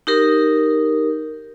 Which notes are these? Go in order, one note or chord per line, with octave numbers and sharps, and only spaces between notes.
D#4 G4 A#4